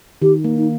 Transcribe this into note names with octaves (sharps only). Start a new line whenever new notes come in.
D#3 G4
A#3
D#4